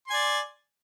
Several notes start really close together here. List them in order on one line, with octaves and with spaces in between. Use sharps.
C6 G#5 D5